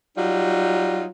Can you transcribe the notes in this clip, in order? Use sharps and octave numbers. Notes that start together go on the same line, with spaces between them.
F#3 G3 D#4 F4